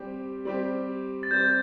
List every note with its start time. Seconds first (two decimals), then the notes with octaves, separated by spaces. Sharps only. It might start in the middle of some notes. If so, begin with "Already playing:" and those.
Already playing: G3 C4 G4
0.45 G3 C4 G4
1.23 A6
1.31 G3 C4 G4 G6